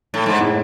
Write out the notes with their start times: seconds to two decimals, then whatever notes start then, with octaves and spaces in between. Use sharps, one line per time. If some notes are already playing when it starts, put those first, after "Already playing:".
0.14 A2
0.26 G#2
0.38 A2 G#3 B3 E4